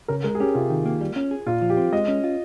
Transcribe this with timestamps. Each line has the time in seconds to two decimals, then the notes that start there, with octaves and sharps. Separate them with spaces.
0.08 C#3 A#4
0.24 G#3 A#4
0.35 G#4
0.40 C#4 G4
0.55 C3 F4
0.70 D#3
0.86 A#3
1.01 G3
1.16 C#4
1.31 G#4
1.46 A#2 F4
1.62 F3
1.70 G4
1.77 C4
1.93 G#3 D#5
2.08 C#4
2.24 F4